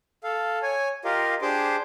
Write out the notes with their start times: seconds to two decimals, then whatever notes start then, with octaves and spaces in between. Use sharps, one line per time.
0.24 A4 F5
0.63 C#5 G#5
1.05 F4 G4 A#4 D#5 F5
1.42 D4 G4 G#4 C5 C6 D6